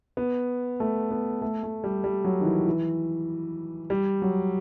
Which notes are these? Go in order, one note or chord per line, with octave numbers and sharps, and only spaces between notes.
B3
A3
B3
A3
A3
G3
G3
F#3
D#3
E3
E3
G3
F#3